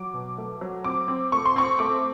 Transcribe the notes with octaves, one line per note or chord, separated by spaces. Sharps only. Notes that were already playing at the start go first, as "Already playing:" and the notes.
Already playing: F#3 D6
B2
A3
F#3
C4 D6
C4
A3 C#6
C6
C4 C#6
A3 D6